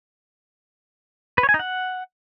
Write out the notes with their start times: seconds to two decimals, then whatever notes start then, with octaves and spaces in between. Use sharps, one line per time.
1.38 B4
1.43 C#5
1.49 G#5
1.54 D#4
1.59 F#5